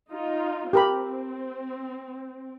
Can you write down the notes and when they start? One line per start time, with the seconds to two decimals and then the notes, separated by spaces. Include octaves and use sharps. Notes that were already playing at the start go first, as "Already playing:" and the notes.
0.11 D#4 F4
0.73 C4 G4 A#4 B5